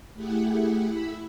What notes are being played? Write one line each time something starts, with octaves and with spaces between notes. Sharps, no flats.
A3 E4 G4 G#4 F#5
E4 E5 B5